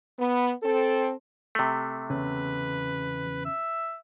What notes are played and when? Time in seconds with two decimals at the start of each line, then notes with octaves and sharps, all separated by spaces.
0.18 B3
0.63 C4 A4
1.55 C3 A3
2.10 E2 C#3 B4
3.45 E5